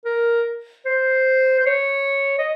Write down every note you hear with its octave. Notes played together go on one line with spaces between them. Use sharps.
A#4
C5
C5
C#5
D#5